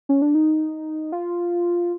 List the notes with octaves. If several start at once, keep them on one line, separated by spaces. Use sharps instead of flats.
C#4
D4
D#4
F4